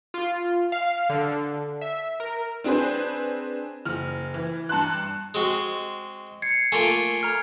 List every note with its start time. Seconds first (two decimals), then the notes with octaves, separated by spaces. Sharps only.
0.14 F4
0.72 F5
1.10 D3
1.81 E5
2.20 A#4
2.64 C4 D4 G#4 B4 C5
3.85 F#1 F6
4.34 E3
4.69 G2 A5 C6 F#6
5.34 G#3 C4 F#4
6.42 G#6 C7 C#7
6.72 A3 A#3 F4 G#5 D7
7.21 A#5 F6 G#6